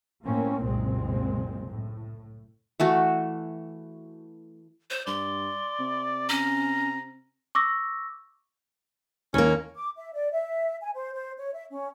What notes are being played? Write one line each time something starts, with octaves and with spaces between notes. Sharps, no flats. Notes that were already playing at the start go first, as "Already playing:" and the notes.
A2 A#3 C4 C#4
F#1 C2 A#2 G#3 C4
A2
E3 A3 F#4
C5
G2 D5 C6
C3
C#4 A#5
C#6 D6 E6 A#6
D#2 A#3 C#4
D6
E5
D5
E5
G#5
C5
C5
C#5
E5
C#4